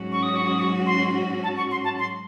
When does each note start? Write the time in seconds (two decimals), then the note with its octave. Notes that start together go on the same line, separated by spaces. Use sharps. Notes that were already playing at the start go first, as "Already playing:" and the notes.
Already playing: G#2 F#3 C#4 F#4
0.12 C#6
0.23 D#6
0.36 C#6
0.47 D#6
0.59 C#6
0.86 C6
1.43 A5
1.57 C#6
1.71 C6
1.84 A5
1.99 C6